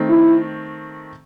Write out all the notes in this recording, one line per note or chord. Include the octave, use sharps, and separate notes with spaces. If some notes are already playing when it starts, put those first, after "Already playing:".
Already playing: D#3 A3 C4
E4